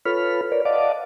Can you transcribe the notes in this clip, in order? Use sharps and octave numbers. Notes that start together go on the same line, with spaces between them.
F4 A4 B4 C#5 B5 F6
A#4 B4 C#5 D5
D5 D#5 F5 F#5 A5 D6